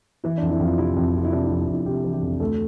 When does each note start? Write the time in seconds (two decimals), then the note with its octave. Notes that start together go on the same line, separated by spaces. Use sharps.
0.24 E3 E4
0.38 F2 D4
0.51 E4
0.60 F2
0.65 F4
0.78 C3 E4
0.96 F2
1.11 G4
1.14 C3 F4
1.25 E4
1.32 C3 D4
1.46 F2 E4
1.60 E4
1.68 F2
1.74 E4
1.86 C3 G4
2.04 E3
2.14 G4
2.23 F2
2.40 D2 A4